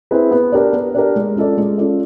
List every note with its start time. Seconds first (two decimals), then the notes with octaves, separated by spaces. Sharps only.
0.11 C4 E4 G#4 B4
0.31 B3
0.52 D4 G4 A#4
0.73 B3
0.95 D4 G4 A#4
1.16 G#3
1.36 C#4 F4 A4 D5
1.57 G#3
1.78 C#4 F4 A4 D5